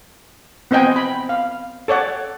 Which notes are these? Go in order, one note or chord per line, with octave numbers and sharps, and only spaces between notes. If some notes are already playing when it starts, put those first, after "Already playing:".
B3 C4 C5 D#5 G5 G#5
B5
F5
A4 C#5 D5 F#5